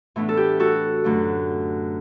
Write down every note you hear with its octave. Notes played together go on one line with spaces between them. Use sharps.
A2 E3 B3 D4
A4
G4
F#4 A4
F#2 D3 F#3 A3 D4